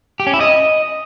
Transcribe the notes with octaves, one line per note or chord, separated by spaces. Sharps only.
G4
C#4
E4
D#5